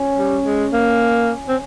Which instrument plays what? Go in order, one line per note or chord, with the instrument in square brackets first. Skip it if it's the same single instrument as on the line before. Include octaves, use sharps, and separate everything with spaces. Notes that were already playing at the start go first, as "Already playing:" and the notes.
Already playing: [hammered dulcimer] C#4
[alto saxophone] G3
G#3
A#3
C4